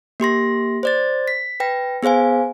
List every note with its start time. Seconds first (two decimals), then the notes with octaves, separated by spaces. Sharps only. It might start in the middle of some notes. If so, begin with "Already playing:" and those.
0.20 A#3 G4 C6 A#6
0.83 C5 D5 A6
1.28 B6
1.60 B4 G5 A#6
2.03 B3 G#4 C5 F5 G#5